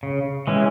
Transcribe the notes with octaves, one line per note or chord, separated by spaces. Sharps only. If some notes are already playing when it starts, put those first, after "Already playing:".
C#3
E3 G#3 C#4